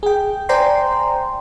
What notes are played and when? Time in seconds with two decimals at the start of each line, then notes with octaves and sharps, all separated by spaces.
0.03 G#4 G5
0.49 C5 D5 G5 G#5 A#5 C6